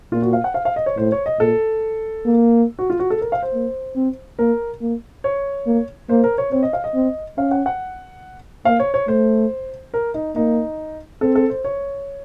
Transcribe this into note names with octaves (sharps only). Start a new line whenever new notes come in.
A#2 F4
F#4
F5
F#5
F5
F5
D#5
C#5
A2 C5
C#5
D#5
A#2 A4
A#3
F#4
F4
F#4
A4
A#4
F5
C5
A#3
C4
A#3 A#4
A#3
C#5
A#3
A#3 C5
A#4
C#5
C4 C#5
D#5
F5
D#5
C4
C#4 F5
F#5
F#5
A#3 F5
C#5
C#5
A3 C5
A#4
D#4
A#3 D#4
C4 A4
A4
C5
C#5